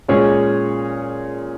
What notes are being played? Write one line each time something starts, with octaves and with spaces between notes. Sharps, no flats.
A#2 G#3 C#4 G#4 C#5